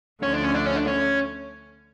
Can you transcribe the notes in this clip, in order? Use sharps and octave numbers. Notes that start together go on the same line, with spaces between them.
D2 D3 F3 A3 C#4
D4
C#4
D4
C#4
D4
C#4